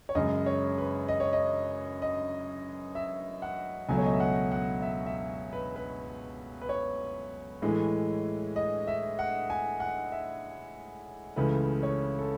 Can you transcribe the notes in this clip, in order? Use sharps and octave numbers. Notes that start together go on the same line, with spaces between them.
C#5
F#2 C#3 G#3 D#5
C#5
B4
D#5
C#5
D#5
D#5
E5
F#5
C#2 B2 F#3 A3 G#5
C#5
D#5
E5
F#5
F#5
E5
E5
B4
B4
B4
C#5
A2 E3 G#3
D#5
E5
F#5
G#5
F#5
E5
C#2 C#3 E3 A3 B4
C#5
A4